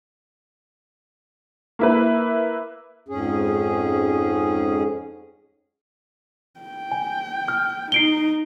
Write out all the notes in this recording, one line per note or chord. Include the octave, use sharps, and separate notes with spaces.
A#3 E4 B4
F2 G#2 C#4 G#4
G5
G#5
F6
D#4 C7 D7 G7